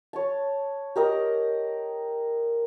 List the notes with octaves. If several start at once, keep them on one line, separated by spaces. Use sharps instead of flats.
C#5 A5
G4 A#4 D#5